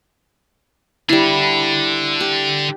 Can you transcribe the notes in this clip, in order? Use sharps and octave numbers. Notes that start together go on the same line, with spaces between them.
D3 G3 D4 E4
G4